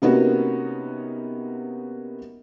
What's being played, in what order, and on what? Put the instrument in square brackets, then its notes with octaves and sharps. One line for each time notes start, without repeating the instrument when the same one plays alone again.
[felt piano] C3 A#3 B3 C#4 D#4 F#4